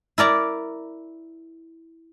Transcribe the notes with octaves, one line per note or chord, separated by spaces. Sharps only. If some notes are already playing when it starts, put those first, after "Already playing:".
E4 A#4 D5 A#5